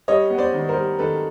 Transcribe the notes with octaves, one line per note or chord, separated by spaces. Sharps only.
G3 C#5 D#5
B3
C5 D5
D#3
A#4 C5
G3
D#3 A4 B4